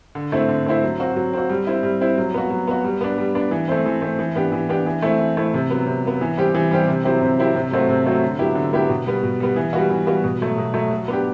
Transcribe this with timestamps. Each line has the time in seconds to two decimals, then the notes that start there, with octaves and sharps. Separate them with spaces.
0.15 D3
0.32 A3 C4 E4
0.49 D3
0.66 A3 C4 E4
0.84 F#3
1.00 C4 F#4
1.16 F#3
1.33 C4 F#4
1.50 G3
1.67 C4 E4
1.83 G3
2.01 C4 E4
2.18 F#3
2.34 B3 F#4
2.50 F#3
2.67 B3 F#4
2.84 G3
3.01 B3 D4
3.18 G3
3.35 B3 D4
3.51 E3
3.68 A3 C4
3.86 E3
4.02 A3 C4
4.19 E3
4.36 B3 D4 G4
4.52 E3
4.69 B3 D4 G4
4.86 E3
5.02 A3 C4 E4
5.19 E3
5.37 A3 C4 E4
5.54 C3
5.70 F#3 B3
5.86 C3
6.04 F#3 B3
6.21 E3
6.37 G3 C4 G4
6.55 E3
6.71 G3 C4 G4
6.88 C3
7.04 F#3 C4 E4 G4
7.21 C3
7.38 F#3 C4 E4 G4
7.55 C3
7.71 F#3 A3 C4 F#4
7.89 C3
8.06 F#3 A3 C4 F#4
8.22 D3
8.39 F#3 B3 E4 G4
8.55 D3
8.73 F#3 B3 E4 G4
8.89 B2
9.06 G3 B3
9.23 B2
9.40 G3 B3
9.56 E3
9.73 G3 B3 F#4
9.91 E3
10.07 G3 B3 F#4
10.24 B2
10.41 F#3 A3
10.58 B2
10.74 F#3 A3
10.91 F#3
11.08 B3 D4 G4